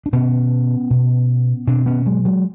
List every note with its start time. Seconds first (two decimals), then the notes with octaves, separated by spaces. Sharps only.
0.06 D4
0.13 B2 B3 C#4
0.90 B2
1.67 B2 C4 D4
1.86 B3 C#4
2.06 F#3 G#3
2.25 F#3 G#3